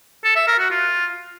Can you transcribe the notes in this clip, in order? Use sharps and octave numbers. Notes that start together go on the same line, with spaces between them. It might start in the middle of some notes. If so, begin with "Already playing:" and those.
A4
E5
A#4
F#4
F4